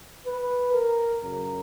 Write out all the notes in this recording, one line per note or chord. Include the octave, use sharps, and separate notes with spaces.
B4
A#4
F#2 C#3 F#3 A#4